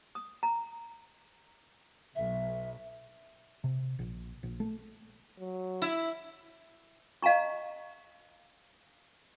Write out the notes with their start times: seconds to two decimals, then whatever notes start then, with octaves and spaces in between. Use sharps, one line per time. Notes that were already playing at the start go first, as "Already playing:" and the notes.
0.15 D#6
0.43 A#5
2.15 B1 E5
3.64 C3
3.99 A#1
4.43 A#1
4.60 A3
5.39 F#3
5.82 E4
7.22 D#5 F5 A5 A#5 C#6